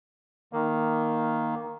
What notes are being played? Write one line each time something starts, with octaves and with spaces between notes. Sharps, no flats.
D#3 A#3